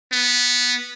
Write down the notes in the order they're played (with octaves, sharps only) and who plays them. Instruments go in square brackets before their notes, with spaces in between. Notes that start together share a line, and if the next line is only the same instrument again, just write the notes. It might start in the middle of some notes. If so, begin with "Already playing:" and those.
[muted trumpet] B3